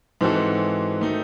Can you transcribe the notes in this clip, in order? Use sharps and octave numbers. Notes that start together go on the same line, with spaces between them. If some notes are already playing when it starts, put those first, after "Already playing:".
G#2 E3 C4 F#4 A4
D#3 A3 D#4